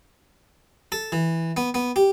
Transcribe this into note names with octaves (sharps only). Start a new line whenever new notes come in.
A4
E3
B3
B3
G4